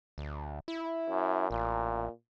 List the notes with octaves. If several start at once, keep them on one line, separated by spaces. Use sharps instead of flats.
D2
E4
F#2
A1 A#2